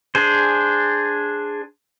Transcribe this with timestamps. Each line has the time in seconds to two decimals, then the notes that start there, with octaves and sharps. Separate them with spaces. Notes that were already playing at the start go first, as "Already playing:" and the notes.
0.15 D4 G#4 C5